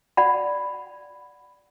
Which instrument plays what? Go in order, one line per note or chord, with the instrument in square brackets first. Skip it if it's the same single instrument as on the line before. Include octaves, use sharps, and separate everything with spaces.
[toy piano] D5 F#5 B5